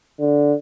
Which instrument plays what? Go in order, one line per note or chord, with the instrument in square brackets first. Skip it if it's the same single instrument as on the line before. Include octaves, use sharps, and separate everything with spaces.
[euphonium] D3